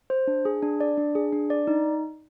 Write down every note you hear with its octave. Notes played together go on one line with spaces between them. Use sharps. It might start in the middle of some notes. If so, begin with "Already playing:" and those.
C5
D4
G#4
D4
D5
D4
G#4
D4
D5
D#4